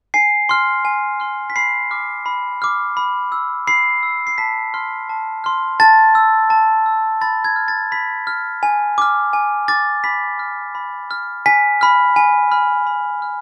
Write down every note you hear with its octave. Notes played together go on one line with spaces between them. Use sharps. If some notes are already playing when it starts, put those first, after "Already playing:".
G#5 C7
C6 F6
G#5
C6 F6
B6
B5 C7
D6 F6
B5
D6 F6
B5
E6
B5 C7
E6
C7
A5 B6
C6 F6
A5
C6 F6
A5 A6
E6
A5
E6
B5 A6
G#6
F6
A6
B5 B6
F6
G#5
D6 F6
G#5
D6 F6 A6
B5 B6
F6
B5
F6
G#5 B6
B5 F6
G#5
B5 F6
B5
F6